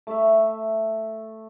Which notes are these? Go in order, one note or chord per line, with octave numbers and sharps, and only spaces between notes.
A3 E5